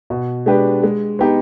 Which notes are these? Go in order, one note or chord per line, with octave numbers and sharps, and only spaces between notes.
B2
G#3 D4 G4 B4
G#3
B3 D#4 G4